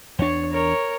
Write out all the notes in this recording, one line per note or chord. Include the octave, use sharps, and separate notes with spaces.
E2 D4 C#5
A#4 C#5